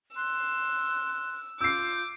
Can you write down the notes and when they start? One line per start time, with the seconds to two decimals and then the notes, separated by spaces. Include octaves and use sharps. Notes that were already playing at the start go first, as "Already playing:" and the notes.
0.16 C6 E6 F#6
1.61 F4 D6 E6 G6 C7